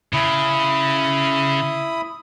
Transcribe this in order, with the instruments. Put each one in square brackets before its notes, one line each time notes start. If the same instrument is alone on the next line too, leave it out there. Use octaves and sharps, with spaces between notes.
[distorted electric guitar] C#3 [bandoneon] E4 B5 D#6